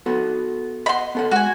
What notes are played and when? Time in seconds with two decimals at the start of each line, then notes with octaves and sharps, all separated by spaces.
0.06 B3 F#4 A4
0.86 D#5 F#5 B5 C6
1.15 B3 A4 F#5
1.31 G#3 F#4 G#5